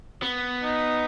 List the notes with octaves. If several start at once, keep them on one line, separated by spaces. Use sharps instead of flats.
B3
D#4